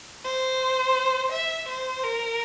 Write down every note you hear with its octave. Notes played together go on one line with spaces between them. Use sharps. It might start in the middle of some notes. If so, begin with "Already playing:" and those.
C5
E5
C5
A#4